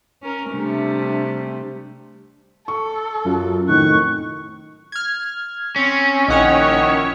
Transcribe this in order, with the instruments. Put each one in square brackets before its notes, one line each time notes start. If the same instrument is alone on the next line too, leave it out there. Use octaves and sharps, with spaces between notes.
[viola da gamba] C#4 A#4
[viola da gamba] C3 G3 A3 [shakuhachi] D4
[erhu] A4 [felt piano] C#6
[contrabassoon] F#2 [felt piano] F4 F#4
[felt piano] F1 A2 [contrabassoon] D#3 [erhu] C#6 [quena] F#6
[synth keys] F6 G#6
[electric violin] C4 [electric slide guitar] C#4
[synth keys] A#1 F#5 F6 [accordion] D#3 D#5 [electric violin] E4 C#5